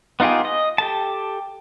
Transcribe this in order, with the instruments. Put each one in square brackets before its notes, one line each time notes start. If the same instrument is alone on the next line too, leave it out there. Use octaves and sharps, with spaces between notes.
[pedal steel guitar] B3 D#4 F4 G4 G#4
D#5
G4 A4 A5